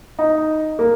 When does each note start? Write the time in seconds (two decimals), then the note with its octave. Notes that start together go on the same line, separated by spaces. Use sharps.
0.19 D#4
0.79 A#3